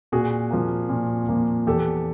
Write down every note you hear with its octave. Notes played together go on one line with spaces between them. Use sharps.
A#2 F#4 G#4
F3 A#3
A#2
F3 A#3
E2 G4 A4